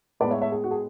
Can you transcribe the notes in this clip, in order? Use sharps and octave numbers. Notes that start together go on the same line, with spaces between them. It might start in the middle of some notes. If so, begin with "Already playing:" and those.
A2 G#3 B3 B4 D5
C#5 E5
C#5 E5
G#4
F#4
G#4